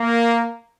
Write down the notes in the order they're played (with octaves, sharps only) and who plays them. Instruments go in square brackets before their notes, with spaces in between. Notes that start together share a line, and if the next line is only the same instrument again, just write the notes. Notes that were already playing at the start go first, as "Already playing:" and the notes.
Already playing: [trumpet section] A#3